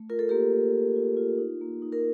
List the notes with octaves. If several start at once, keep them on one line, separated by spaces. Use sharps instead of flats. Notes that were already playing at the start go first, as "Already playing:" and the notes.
Already playing: A3
F4 A#4
A4
A#3 G4 A#4
A#3
F4
F4
F4
D#4
A#3
D#4
A#4